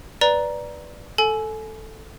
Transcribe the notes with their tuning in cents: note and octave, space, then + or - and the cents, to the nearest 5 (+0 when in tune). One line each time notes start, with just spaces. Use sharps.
B4 +0 D5 +0 A#5 +15
A4 +0 G#5 +30